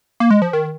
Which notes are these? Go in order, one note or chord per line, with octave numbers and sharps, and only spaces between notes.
A#3
G#3
F3
D#3